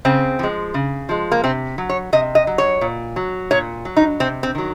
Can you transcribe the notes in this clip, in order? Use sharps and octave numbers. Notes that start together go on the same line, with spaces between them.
C#3 C4
F3 G#3
C#3
F3 G#3
A#3
C3 C4
F#3
C#5
C3 D#5
D#5
F#3
C#5
A#2
F#3
A#2 C#5
F#3
D#4
C3 C4
C4
D#3 F#3